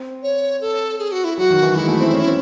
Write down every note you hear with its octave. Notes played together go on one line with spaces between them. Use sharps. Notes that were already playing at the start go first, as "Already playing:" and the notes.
Already playing: C4
C#5
A4
G#4
F#4
E4
F#3 F#4
D#3
E3
G#3 E4
A3
C4
C#4
C4